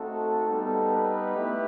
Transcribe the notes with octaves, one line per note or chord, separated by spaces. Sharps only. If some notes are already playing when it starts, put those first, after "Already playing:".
Already playing: A3 C4 D#4 F#4 A4
G3 B3 D#4 A4
B4
A3 E4 G4